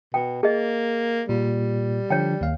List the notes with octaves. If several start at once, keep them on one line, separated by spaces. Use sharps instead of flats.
B2 G5
A#3 G#4 D#5
A#2 G3
D3 F3 D4 C#5 G5
D#2 F5